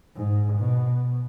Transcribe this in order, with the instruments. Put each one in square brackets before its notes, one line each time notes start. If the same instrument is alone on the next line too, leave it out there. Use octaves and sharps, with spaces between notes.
[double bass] G#2
B2